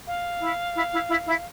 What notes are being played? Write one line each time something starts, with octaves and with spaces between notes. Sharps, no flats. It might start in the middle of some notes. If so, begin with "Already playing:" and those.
F5
E4
E4
E4
E4
E4